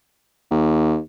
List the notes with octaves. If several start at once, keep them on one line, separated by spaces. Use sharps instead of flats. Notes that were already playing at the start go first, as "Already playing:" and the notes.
D#2